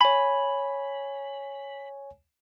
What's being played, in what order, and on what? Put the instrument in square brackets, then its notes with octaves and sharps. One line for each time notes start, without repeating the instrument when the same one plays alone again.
[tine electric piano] C#5 G#5 [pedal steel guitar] B5